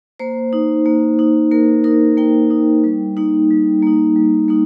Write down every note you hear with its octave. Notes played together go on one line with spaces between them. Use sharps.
A#3 C5
D#4
A#3
D#4
A#3 A#4
D#4 A#4
A#3 G5
D#4
G3
A#3 D#4
G3
A#3 D#4
G3
A#3 D#4